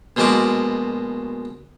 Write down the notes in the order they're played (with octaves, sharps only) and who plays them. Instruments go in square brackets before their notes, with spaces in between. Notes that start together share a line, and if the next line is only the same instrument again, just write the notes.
[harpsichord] A#1 B2 F3 G#3 F#4 D6